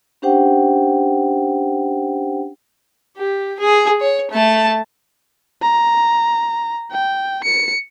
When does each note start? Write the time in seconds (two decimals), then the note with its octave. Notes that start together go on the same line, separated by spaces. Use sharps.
0.22 C#4 D4 G4 C5 F#5 G5
3.17 G4
3.59 G#4
4.00 C#5
4.31 A3 A5
5.62 A#5
6.92 G5
7.44 C#7